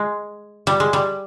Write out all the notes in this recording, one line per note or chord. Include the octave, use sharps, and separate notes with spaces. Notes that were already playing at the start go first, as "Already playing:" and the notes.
Already playing: G#3
G3
G#3
G3